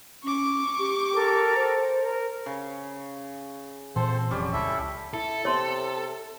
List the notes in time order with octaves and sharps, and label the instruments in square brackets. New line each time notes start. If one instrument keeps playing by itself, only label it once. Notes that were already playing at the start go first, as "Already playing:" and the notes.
[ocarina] C#4 [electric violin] C#6 D6
[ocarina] G4
[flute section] A4 A#4 G5
[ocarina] C5
[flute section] A#4
[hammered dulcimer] C#3
[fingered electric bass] A#2 E3 [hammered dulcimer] C4 [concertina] A4 C5
[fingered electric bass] F1 [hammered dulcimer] G3 C#4 [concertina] D5
[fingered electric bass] C#2 [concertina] E4 A4 E5
[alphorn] E4 [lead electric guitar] A4
[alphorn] C3 [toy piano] C#5 C6